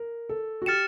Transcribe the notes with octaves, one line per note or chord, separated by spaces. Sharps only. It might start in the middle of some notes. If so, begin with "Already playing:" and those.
Already playing: A#4
A4
F#4
G4 F6 A6 C#7 E7